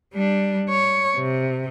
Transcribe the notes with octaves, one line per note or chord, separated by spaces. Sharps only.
G3 D4
C#5
C3